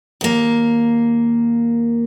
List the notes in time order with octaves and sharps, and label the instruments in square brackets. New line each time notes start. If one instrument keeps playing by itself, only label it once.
[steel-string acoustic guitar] D#2 A#3